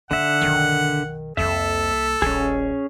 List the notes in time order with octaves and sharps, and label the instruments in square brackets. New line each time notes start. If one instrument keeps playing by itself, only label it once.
[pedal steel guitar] D3 E5 [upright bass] D#4 [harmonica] F#5
[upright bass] B1 F2 [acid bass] D#3
[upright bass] C2 A#3 [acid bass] F2 [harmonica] A4 [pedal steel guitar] E5
[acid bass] D#1 [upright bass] A#1 [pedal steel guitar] C#4 G#4